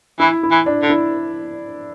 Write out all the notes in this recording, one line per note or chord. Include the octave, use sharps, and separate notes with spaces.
E3 E4
E4
E3
D4
D3
E4